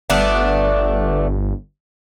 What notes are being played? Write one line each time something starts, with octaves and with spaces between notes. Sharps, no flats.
G1 A3 B3 D4